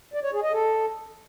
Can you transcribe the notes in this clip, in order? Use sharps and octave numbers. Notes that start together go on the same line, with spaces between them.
D5
C#5
G#4
D#5
A4